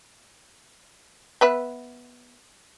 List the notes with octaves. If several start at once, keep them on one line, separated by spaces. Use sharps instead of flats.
B3 B4 E5